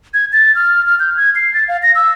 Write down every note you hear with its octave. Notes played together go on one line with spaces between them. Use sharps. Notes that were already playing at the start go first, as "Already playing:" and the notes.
G#6
A6
F6
F6
G6
G#6
C7
A6
F5
A#6
E6